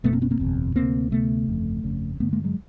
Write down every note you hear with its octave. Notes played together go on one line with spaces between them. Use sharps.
F#1 E2 B2 A3 B3
A#3 C4
B3 C#4
A#3 C4
F#1 E2 B2
D2 C3 A#3 C4
D2 C3 A3 B3
G1 F2 C#3
G1 F2 C#3
A1 G2 D3 A3 B3
G#3 A#3
F#3 G#3